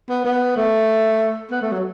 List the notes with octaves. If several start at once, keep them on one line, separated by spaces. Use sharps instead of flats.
B3
B3
A3
B3
A3
F#3